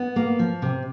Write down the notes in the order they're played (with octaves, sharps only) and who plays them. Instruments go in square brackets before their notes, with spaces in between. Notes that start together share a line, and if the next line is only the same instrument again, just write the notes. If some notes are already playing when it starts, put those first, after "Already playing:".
Already playing: [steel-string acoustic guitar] B3
A#3
F3
C3